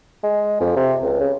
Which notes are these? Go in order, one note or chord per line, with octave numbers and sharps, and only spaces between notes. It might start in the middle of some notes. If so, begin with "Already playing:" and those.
G#3
F2
C3
C#2
C#3